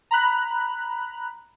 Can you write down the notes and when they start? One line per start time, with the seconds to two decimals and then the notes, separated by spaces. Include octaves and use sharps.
0.11 A#5 B5 F#6